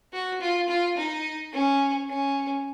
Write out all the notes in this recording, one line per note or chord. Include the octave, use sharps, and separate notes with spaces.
F#4
F4
F4
D#4
C#4
C#4